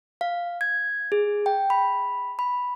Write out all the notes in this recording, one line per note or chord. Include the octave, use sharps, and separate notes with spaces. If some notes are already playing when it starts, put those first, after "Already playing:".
F5
G#6
G#4
G5
B5
B5